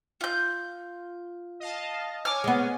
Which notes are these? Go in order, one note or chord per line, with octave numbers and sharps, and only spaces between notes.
F4 G6
D#5 F5 A5
C#5 G#5 D6 F6
G#3 B3